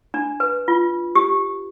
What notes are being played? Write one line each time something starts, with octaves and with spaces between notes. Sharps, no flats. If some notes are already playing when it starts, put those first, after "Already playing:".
D4
B4
F4
G4